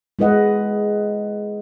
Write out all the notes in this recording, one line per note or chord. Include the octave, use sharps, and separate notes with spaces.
G#3 E4 B4 D#5 F#5